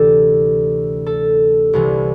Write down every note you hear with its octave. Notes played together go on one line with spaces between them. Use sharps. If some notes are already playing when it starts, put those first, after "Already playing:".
Already playing: D2 C3 E3 G4 A4
A4
C2 C3 E3